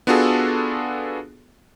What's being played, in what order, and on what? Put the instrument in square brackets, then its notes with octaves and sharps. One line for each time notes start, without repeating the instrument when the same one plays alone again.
[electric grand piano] B3 D4 F4 F#4 G#4 A4